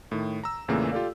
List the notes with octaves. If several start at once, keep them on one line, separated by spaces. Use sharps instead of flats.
A2 D#3
A#5 E6
E2 A#2 C#3 E3 A3 A#3
F4 G4 A4 D5 F5